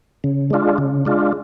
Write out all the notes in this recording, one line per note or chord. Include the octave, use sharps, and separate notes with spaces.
C#3
G#3 D4 F4
C#3
G#3 D4 F4